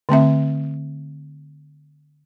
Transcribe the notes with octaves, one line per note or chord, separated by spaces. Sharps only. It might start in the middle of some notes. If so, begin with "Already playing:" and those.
D3 A3 C4 E5